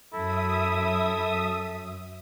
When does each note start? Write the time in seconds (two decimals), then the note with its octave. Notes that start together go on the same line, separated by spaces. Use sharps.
0.13 F#2 E4 A4 E5 D#6